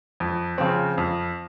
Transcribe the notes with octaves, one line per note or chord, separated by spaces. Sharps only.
F2
C#3 F3 C4
F2